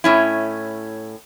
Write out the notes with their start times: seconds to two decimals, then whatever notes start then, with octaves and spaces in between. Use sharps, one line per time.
0.04 A2 C#4 E4